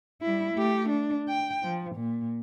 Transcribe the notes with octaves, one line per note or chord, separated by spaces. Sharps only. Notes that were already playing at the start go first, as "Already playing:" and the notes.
G3 E4
A3 G4
D4
G5
F3
A#2